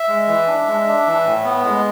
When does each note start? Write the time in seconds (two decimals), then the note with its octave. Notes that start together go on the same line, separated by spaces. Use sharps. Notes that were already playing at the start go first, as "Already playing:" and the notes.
Already playing: E5
0.09 G#3
0.28 E3
0.47 D4
0.67 G#3
0.87 D4
1.06 E3
1.25 A2
1.45 B3
1.65 G#3